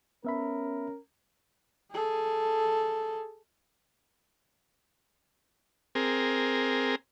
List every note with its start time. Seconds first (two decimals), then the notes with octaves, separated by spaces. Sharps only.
0.24 B3 C#4 A#4 E5 B5
1.92 G#4 A4
5.95 C4 G#4 A#4